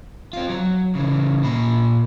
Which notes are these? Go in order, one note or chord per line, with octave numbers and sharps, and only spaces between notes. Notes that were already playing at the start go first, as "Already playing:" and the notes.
C4 F4
F#3
C#3 E3
A#2 B5